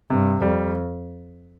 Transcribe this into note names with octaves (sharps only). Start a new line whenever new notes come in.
G2 C3
F2 G3